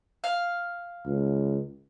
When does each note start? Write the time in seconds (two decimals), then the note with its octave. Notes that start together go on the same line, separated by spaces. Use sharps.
0.24 F5
1.06 C#2